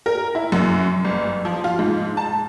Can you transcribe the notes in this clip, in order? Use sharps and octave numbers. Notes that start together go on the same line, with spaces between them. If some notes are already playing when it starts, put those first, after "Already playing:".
A#4
E4
F#2
G1
F3
F4
G#2
A5